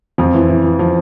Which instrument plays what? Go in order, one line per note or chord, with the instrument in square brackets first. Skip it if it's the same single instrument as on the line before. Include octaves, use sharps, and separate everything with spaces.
[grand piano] F2 F3
E3
E3
E3
F3